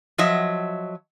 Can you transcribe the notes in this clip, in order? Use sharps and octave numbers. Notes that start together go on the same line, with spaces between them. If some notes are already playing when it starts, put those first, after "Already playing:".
F3 F#3 D#5 E5